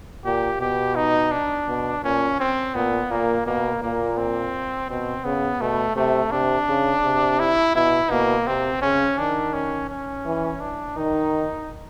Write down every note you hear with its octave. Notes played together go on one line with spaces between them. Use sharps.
A#2 G4
B2 G4
D#4
D4
B2
A#2 C#4
C4
A#2 B3
A#2 A#3
B2 A#3
A#2 A#3
C4
B2 C4
C#3 B3
B2 A3
C3 A3
C3 D4
C#3
C3
E4
B2 E4
B2 A#3
C3 C4
C#3 C#4
D#3 D4
C#4
C#4
E3
D4
D#3 D#4